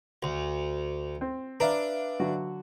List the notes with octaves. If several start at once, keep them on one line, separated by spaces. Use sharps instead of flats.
D2
C4
D4 B4 E5 F5 A#5
D3 F#3 F#4